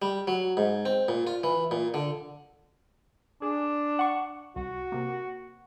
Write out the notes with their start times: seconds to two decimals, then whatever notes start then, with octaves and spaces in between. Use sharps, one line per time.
0.02 G3
0.28 F#3
0.57 G#2
0.86 C4
1.08 A#2
1.27 F4
1.44 E3
1.71 A#2
1.94 D3
3.42 D4 G#4
3.99 F#5 C#6
4.56 C2 F#4
4.92 C3 A#3